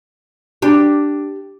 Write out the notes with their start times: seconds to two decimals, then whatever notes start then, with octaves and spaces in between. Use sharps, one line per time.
0.62 D4 G4